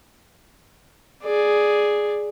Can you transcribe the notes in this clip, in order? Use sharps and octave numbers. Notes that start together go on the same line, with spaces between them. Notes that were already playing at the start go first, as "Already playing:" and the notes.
G#4 D5